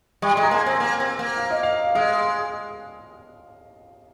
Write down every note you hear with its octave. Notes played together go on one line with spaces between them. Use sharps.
G3 C#6
G#3 C6
A#5
A#3 G#5 C6
C4
A#3
C4
A#3
F5
D#5
F5
G#3 F5